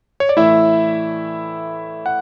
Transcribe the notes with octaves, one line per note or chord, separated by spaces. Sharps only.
C#5
D5
A2 E3 A3 E4 E5
F#5